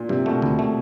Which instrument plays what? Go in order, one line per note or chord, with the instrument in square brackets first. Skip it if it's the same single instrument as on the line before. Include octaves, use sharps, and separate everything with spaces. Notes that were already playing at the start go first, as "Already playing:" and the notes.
Already playing: [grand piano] A#2
[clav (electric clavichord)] G2 [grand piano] C3
[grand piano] B2 [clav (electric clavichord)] A3
[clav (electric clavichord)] D2
A3